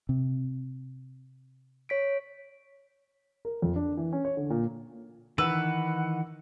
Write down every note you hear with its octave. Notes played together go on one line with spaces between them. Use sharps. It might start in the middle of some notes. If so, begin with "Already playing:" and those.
C3
C#5 B6 D7
A#4
F2
D4
E3
C#4
C#5
D3
A#2
D#3 E3 B4 F#5 E6